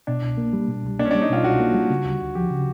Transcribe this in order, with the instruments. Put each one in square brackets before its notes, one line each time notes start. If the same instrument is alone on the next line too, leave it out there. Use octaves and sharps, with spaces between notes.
[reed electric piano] B2 [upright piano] D4
[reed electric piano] C2
A#3
G3
B2
C2
[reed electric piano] A#3 [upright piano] D4
[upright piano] C#4
D4
[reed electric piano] G3
[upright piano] D#4
[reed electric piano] B2 [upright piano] F4
[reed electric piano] C2 [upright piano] F#4
[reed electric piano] A#3
G3
C#3
D2
D2
[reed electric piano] F3 [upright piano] G4
[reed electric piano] C#3